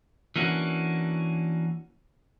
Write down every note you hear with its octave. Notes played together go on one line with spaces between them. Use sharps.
E3 A#3 C#4 D4 F#4